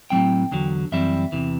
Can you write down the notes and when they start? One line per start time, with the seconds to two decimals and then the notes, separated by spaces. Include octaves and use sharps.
0.10 A2 F#3 A3 C4 G5
0.51 E2 D3 F#3
0.92 F#2 E3 G3 C4 E4 E5
1.32 E2 C3 E3